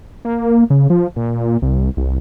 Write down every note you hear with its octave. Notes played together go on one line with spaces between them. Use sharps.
A#3
C#3
F3
A#2
C2
C2